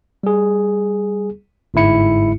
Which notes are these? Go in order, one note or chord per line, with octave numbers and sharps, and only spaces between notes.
G3 G#4
G1 G#2 G#3 E4 C#7